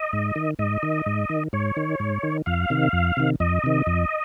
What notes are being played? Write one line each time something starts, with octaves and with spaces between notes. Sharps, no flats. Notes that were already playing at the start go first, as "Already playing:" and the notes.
Already playing: D#5
G#2
D#3
G#2 D#5
D#3
G#2
D#3
G#2 C#5
D#3
G#2
D#3
F2 F5
C3 D#3
F2
C3 D#3
F2 D#5
C3 D#3
F2